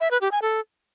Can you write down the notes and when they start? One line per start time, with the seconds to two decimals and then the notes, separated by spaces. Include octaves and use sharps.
0.01 E5
0.11 B4
0.21 G4
0.32 G#5
0.42 A4